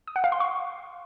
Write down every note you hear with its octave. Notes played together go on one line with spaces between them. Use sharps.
D#6
F#5
F5
C6
C#6